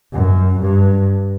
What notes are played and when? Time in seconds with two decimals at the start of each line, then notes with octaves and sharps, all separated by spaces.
0.13 F#2
0.62 G2